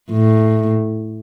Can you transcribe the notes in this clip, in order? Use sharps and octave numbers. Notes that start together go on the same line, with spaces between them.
A2